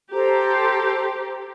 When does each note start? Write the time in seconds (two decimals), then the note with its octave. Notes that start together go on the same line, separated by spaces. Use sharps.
0.13 G4 A4 C5 A#5